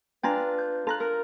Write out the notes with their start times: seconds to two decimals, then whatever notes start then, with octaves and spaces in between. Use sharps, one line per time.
0.23 D4 F4 B4 G5 G#5 A#5
0.58 G6
0.87 F4 A4 A#5 F#6
1.00 A#4